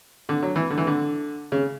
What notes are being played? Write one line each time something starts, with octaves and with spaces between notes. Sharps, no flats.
D3
F#3
E3
D3
E3
D3
C#3